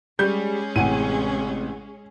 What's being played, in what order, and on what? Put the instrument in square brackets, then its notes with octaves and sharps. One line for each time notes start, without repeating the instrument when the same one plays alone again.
[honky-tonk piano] G3 [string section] G#3 C#4 G#4 [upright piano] G6
[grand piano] A1 C3 [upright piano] E4 F#5 G#5 [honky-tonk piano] D#7